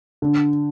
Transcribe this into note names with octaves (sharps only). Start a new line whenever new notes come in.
D3